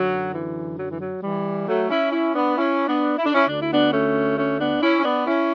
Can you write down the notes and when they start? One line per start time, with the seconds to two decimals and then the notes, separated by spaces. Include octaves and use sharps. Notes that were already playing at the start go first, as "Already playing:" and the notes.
Already playing: F#2 D3 F#3
0.33 E3
0.78 F#3
0.90 E3
1.00 F#3
1.22 E3 G3
1.68 F#3 A3
1.90 C#4 E4
2.12 C#4 E4
2.35 B3 D4
2.57 C#4 E4
2.88 B3 D4
3.18 E4
3.26 D4
3.35 C#4 E4
3.48 D2 D3 D4
3.60 E4
3.73 B3 D4
3.93 A3 C#4
4.37 A3 C#4
4.60 B3 D4
4.83 C#4 E4
4.99 C#4
5.04 B3 D4
5.26 C#4 E4